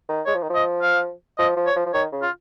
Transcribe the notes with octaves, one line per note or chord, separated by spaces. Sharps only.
D#3
G#3 C#5
F3
D#3
F3
D#5
F5
F3 D#5
F3
C#5
F3
F3
D#3 C#5
C#3
F4